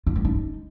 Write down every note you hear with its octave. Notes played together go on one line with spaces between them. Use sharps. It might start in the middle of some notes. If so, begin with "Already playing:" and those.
F4
C#4
D#4